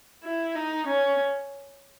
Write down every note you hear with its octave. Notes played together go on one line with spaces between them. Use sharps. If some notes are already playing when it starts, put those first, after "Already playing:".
E4
D#4
C#4